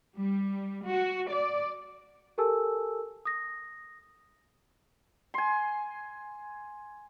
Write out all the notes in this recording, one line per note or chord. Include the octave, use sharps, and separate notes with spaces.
G3
F#4
D5
G4 A4 A#4 G#5 A5 E6
D#6 A#6
G#5 C6